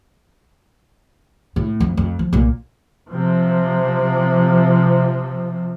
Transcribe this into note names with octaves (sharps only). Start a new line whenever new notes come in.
A2
F2
F2
F3
B1 A#2
C3 F3